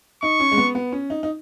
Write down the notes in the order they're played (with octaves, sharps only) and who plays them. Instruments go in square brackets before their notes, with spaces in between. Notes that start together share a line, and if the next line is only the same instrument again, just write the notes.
[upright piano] D#4 [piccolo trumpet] C#6
[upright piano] C#4
G#3
B3
B3
C#4
D#4
D#4